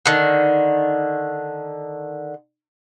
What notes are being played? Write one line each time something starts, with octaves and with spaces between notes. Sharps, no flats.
D3 D#3